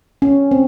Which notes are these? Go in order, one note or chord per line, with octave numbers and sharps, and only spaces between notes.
C#4
C4